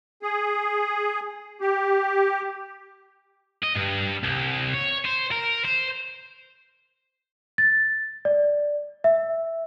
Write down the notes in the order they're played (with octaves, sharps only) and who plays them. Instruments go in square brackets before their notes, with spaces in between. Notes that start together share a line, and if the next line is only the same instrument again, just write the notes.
[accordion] G#4
G4
[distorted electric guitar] D#5
G2
C2
C#5
C5
A#4
C5
[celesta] A6
D5
E5